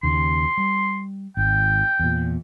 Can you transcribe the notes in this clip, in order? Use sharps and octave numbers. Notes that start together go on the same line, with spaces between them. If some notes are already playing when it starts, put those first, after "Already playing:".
D#2 C#3 C6
G3
G#1 G5
E2 A#2